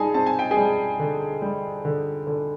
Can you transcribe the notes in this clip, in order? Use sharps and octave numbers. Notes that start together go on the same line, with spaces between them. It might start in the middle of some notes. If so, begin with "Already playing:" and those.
Already playing: G3 D#4 G#4 D#5 G#5 A5
C4 A5
G#5
G5
G#4 G#5
G3
D3
G3
D3
D3